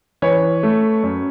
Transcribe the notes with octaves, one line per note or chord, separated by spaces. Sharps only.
E3 B4 C#5
A3
F#2